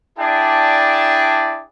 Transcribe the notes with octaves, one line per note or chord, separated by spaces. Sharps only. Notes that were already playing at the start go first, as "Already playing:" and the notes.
D4 E4 G#4 D5 G5 A5